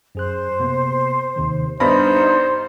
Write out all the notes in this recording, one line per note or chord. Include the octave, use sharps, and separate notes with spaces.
F#2 G#4 C5 F#6
C3 A#3 B3
D#2 C3 D#3
G2 B3 D#4 C5 B5 A#6